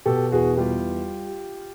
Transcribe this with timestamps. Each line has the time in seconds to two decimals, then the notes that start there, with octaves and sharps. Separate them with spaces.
0.06 B2 G4 A4
0.32 E2 F#4 G#4
0.57 G3 F4 G4